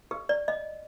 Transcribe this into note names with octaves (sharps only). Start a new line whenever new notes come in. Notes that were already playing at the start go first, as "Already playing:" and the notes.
G4
D5
D#5